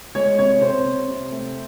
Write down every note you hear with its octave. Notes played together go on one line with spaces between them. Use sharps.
G#3 C#5
C3 C#5
C3 C5
C3
C3
A3